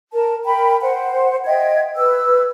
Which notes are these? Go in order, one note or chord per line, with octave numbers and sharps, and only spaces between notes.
A#4 A5
A#4 G5 B5
C5 F#5
D#5 E5 G5 G#6
B4 E6